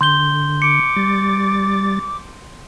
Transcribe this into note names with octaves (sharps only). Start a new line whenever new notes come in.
D3 C6 G6 G7
D6 C#7 D7
G3 A6